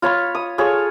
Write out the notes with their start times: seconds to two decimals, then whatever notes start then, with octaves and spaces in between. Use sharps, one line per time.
0.02 F4 C#5 B5
0.35 D#6
0.58 F4 G#4 A4 C#5